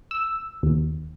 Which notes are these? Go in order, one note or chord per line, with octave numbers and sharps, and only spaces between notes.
E6
D#2